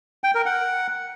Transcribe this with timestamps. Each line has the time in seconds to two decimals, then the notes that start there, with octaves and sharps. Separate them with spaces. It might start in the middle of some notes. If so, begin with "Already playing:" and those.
0.24 G5
0.35 A#4
0.46 F#5